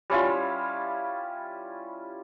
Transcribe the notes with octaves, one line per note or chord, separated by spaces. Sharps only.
G3 C#4 E4 F4